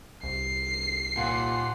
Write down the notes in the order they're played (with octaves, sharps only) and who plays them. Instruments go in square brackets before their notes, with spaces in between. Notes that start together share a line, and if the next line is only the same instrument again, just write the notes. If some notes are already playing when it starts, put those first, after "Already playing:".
[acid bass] C2 [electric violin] C7
[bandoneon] D#2 F4 F#5 [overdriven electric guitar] A#2